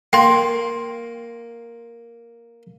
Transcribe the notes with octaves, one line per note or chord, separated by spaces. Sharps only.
A#3 G5 C6